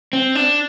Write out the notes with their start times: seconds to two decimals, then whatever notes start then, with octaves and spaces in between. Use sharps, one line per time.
0.13 C4
0.35 D4